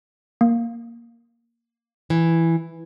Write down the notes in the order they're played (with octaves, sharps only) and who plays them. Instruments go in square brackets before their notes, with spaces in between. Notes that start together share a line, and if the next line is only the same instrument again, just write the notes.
[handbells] A#3
[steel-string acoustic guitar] E3